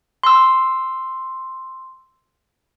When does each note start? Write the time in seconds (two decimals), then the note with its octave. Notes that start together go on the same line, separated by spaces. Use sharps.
0.23 C6 E6